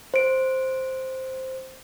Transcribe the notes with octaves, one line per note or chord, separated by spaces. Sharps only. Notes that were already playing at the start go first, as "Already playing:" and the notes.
C5 D7